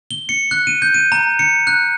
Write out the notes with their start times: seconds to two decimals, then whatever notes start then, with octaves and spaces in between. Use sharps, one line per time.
0.11 G7
0.29 C#7
0.51 F#6
0.67 D#7
0.82 G6
0.94 D#7
1.12 A#5
1.39 C#7
1.67 F#6